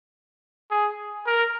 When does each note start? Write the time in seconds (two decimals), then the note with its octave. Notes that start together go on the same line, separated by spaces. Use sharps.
0.71 G#4
1.27 A#4